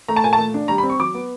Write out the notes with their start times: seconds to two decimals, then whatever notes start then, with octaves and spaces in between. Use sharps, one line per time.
0.08 A3 A#5
0.16 A5
0.24 A#2 G#5
0.33 A5
0.39 A3
0.54 D4
0.68 G3 A#5
0.78 B5
0.83 C4
0.89 C#6
1.00 F#3 D6
1.14 B3